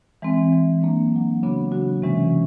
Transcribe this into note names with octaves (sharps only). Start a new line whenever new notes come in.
E3 G#3 C4
E3 G#3 C4
F#3 A#3 D4
F#3 A#3 D4
C#3 F#3 B3 D4 F#4
C#3 F#3 B3 D4 F#4
C3 E3 G#3 C#4